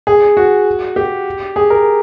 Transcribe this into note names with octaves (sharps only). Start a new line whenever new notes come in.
G#4
F#4
G4
G#4
A#4